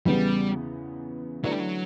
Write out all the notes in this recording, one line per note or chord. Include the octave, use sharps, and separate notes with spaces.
E2 C#3 E3 G3 B3
D3 F#3 A3 E4 B4 D5
G3
F#3